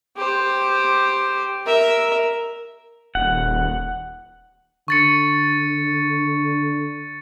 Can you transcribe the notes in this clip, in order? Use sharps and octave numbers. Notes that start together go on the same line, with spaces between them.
G4 C5
A#4 E5
D#1 F#5
D3 C#6 A6 C#7